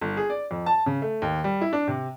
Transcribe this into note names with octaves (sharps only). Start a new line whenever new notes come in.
G1
G#4
D5
F2
A5
C#3
A3
D#2
G3
E4
D4
C3